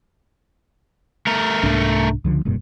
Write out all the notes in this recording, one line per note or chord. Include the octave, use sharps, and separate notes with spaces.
A3 A#4
C2 G#2 D4
C#2 D3 F3
F1 G2 A#2